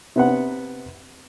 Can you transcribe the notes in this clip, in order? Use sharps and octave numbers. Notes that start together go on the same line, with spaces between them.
C3 B3 F#5